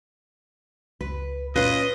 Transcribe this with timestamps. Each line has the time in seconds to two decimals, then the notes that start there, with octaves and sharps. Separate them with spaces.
1.01 C#2 B4
1.56 A#2 C#4 F4 B4 D#5 C7